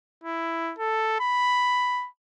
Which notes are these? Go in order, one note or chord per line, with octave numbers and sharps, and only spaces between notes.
E4
A4
B5